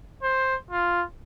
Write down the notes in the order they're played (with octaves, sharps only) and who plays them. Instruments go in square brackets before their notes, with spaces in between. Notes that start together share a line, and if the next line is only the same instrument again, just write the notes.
[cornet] C5
F4